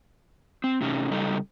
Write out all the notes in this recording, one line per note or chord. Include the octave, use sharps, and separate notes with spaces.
C4
A2 C3 C#4 D#4
C#3 G3 D#4 A4